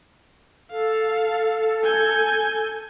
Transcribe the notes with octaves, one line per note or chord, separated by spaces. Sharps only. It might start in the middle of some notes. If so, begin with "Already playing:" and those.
A4 F5
G#5 G6